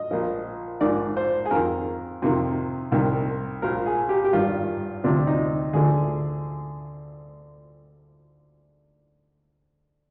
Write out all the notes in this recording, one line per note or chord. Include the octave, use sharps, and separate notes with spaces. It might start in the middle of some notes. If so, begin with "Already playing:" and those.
Already playing: D#5
A#1 A#2 F3
A#1 G#2 D#3 D5
C5
G#4
F2 D#3 A#4
F2 C3 D#3
C2 C3 D#3
A#1 A#2 F3 A#4
G#4
G4
G4
G#1 G2 D#3 F4
D2 C3 F3 D4
D#4
D2 D3 F3 G#4